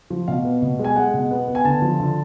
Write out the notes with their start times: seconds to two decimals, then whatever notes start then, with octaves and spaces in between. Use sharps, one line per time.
0.10 F3
0.28 B2 F5
0.44 B3
0.62 B2
0.79 G#3
0.84 G#5
0.96 G#3 F#5
1.14 B2
1.31 B3
1.48 B3
1.55 G#5
1.65 D3 A5
1.82 F3
2.00 D3